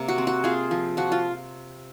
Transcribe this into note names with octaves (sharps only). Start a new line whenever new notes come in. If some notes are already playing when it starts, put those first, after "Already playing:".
Already playing: C3 A#3
F#4
C4
F#4
C4 F4 G#4
F3
F3 F#4
F4